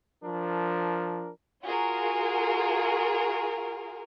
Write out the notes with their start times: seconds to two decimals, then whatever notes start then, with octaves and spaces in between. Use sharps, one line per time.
0.23 F3 D4 A#4
1.63 F4 F#4 G#4 A#4